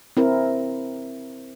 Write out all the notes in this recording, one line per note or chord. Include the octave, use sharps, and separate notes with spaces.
C4 E4 A#4